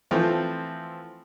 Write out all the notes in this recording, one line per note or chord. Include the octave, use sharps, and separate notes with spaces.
E3 F3 A3 C4